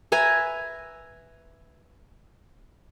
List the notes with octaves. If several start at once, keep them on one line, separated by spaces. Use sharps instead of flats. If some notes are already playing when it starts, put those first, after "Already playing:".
B4 E5 G#5 A#5